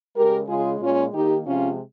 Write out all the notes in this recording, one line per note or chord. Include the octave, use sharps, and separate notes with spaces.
C#3 G#3 G4 A#4
C#3 G#3 F4 G#4
A#2 G#3 C#4 F4
D#3 A#3 D#4 G4
C3 F3 G#3 C#4 F4